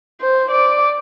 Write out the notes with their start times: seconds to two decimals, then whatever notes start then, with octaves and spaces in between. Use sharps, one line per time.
0.21 C5
0.51 D5